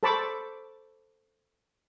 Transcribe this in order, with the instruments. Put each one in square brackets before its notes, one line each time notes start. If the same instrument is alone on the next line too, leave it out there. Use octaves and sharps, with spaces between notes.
[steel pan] A4 C5 A5 B5 C#6 D6